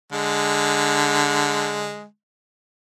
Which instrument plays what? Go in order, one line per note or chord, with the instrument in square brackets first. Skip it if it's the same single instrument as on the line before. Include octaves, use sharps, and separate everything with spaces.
[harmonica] D3 G#3